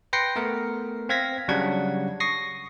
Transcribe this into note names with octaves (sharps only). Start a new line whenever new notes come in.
B4 G5 C6 A#6 C7 C#7
A3 B3 A#4
C4 F5 G#6 A#6 B6
C#3 F#3 G3 D4 F#5 G#6
C#6 D#6 A#6 C7